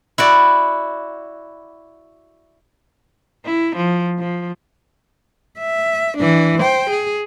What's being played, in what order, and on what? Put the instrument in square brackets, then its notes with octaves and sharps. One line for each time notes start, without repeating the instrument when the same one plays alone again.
[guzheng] E4 F#4 D5
[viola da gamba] E4
F3
F3
[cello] E5
E3 D4
C5 G5
G#4